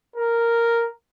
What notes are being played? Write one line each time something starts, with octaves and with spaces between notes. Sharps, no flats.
A#4